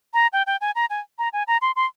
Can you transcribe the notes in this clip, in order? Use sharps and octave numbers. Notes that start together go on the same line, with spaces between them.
A#5
G5
G5
G#5
A#5
G#5
A#5
G#5
A#5
C6
C6